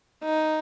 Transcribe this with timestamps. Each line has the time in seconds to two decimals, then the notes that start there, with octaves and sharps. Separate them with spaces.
0.23 D#4